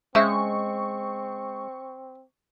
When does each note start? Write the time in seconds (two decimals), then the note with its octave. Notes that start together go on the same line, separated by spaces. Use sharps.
0.15 C#3 G#3 C4 C5 E5 C#6